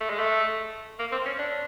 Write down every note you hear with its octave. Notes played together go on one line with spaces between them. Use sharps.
A3
G#3
A3
A#3
C4
C#4
D4